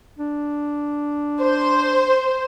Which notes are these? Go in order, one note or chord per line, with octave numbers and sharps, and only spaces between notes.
D4
C5